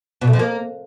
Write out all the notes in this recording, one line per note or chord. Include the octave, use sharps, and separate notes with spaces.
B2
A3
F3
A#3